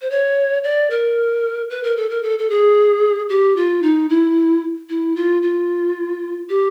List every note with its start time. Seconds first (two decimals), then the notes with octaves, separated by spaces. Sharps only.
0.01 C5
0.10 C#5
0.64 D5
0.90 A#4
1.70 B4
1.83 A#4
1.97 A4
2.10 A#4
2.23 A4
2.39 A4
2.50 G#4
3.29 G4
3.56 F4
3.82 D#4
4.10 E4
4.89 E4
5.16 F4
5.42 F4
6.49 G4